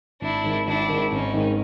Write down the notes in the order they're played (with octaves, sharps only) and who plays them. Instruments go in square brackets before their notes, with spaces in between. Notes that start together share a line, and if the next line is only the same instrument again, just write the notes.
[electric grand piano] G#1 [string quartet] D4 E4
[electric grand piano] G#2 D#3
[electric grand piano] G#1 [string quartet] D4 E4
[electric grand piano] G#2 D#3
[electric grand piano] G#1 [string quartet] C#4 D#4
[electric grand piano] G#2 D#3